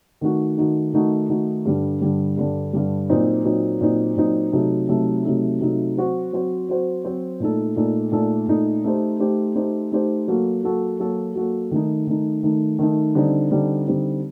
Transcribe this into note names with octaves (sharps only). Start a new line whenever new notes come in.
D#3 A3 D#4 F#4
D#3 A3 D#4 F#4
D#3 A3 D#4 F#4
D#3 A3 D#4 F#4
G2 D3 G3
G2 D3 G3
G2 D3 G3
G2 D3 G3
A#2 F#3 C4 D#4
A#2 F#3 C4 D#4
A#2 F#3 C4 D#4
A#2 F#3 C4 D#4
C3 F#3 A3 D#4 A4
C3 F#3 A3 D#4 A4
C3 F#3 A3 D#4 A4
C3 F#3 A3 D#4 A4
F#3 C4 F#4 C5
F#3 C4 F#4 C5
F#3 C4 F#4 C5
F#3 C4 F#4 C5
A#2 A3 D#4 A4
A#2 A3 D#4 A4
A#2 A3 D#4 A4
A#2 A3 D#4 A4
A3 D#4 G4 C5
A3 D#4 G4 C5
A3 D#4 G4 C5
A3 D#4 G4 C5
F#3 A#3 F#4 A4
F#3 A#3 F#4 A4
F#3 A#3 F#4 A4
F#3 A#3 F#4 A4
D#3 A3 D#4
D#3 A3 D#4
D#3 A3 D#4
D#3 A3 D#4
D3 G3 C4 D#4
D3 G3 C4 D#4
D3 G3 C4 D#4